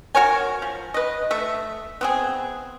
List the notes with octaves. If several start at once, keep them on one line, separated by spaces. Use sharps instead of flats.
F#4 A#4 C#5 G#5
F3
B4 D#5
A3 E5
B3 C4 G#4